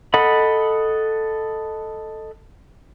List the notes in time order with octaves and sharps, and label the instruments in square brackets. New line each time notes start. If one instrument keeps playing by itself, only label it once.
[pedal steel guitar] A4 D#5 F#5 B5